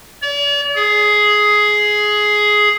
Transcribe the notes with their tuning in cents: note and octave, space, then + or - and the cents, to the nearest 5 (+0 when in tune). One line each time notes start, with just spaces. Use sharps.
D5 -45
G#4 +10